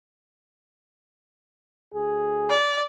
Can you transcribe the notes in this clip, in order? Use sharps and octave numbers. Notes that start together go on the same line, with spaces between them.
D2 G#4
D5